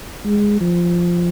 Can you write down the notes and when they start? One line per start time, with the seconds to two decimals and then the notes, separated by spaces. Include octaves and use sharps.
0.24 G#3
0.61 F3